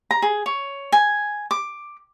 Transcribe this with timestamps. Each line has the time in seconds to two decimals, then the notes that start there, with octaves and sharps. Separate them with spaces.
0.11 A#5
0.22 G#4
0.46 C#5
0.92 G#5
1.51 D6